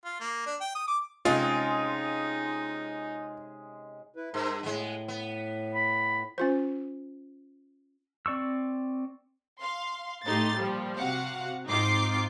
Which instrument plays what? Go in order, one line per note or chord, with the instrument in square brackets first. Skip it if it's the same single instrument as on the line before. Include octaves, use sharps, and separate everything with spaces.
[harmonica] F4
A#3
D4
G5
D#6
D6
[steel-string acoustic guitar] C3 C#4 [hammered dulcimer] G#3 [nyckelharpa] D#4 [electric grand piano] F4
[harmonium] E4 B4
[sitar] G2 [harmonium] A#4 C5
[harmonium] A2 [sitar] G#3 B3
[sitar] B3
[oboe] B5
[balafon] C#4 F4 C5
[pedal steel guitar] C4 D5 C#6 E6
[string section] F5 C6
A2 A3 D#4 G4 C6 A6
A#2 F3 G3
C3 F#4 F5 F#5
G#2 C4 D#4 F4 D6 C7